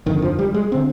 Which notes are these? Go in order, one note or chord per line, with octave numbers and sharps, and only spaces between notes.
G1 F2 D3 D#3
F3
G3
G#3
D3 C4